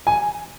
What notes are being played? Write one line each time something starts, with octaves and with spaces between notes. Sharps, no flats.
G#5